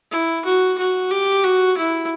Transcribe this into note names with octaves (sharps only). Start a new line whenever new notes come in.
E4
F#4
F#4
G4
F#4
E4